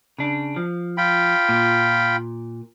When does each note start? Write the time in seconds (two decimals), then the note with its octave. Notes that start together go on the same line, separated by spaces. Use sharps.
0.18 C#3 D4
0.56 F3
0.97 F4 G5 B5
1.49 A#2